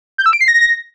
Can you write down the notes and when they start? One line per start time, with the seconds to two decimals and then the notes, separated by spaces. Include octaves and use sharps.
0.18 G6
0.26 E6
0.33 D7
0.41 C7
0.48 A#6